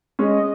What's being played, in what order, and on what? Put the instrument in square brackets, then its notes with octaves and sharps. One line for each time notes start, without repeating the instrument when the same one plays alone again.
[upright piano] G#3 C#4 [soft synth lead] D#5